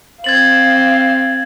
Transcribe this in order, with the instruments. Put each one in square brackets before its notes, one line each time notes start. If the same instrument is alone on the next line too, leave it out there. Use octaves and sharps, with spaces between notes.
[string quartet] C4 [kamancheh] F5 [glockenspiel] G#6 A6 F#7